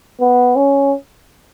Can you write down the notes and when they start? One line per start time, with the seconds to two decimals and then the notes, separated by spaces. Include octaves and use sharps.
0.20 B3
0.56 C#4